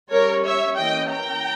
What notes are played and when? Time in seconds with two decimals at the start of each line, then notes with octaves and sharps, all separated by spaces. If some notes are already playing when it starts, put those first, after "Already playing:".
0.11 G3 C#4 A#4 C#5
0.44 C#5 E5
0.77 E3 A#3 C#4 D#5 G5
1.11 G5 A#5